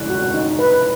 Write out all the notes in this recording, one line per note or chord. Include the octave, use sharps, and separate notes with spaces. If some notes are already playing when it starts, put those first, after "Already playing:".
Already playing: D5 F#6
F#4
D#4
B4